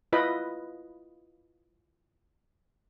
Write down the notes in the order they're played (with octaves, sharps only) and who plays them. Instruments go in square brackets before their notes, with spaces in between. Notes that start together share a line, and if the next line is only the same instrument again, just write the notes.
[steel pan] E4 F4 B4 D#5 B5